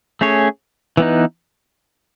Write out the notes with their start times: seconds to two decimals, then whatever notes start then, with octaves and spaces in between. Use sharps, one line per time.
0.21 A3 C#4 G#4 C#5
0.97 E3 B3 D#4